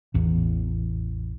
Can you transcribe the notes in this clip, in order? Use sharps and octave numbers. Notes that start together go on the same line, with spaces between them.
A1 E2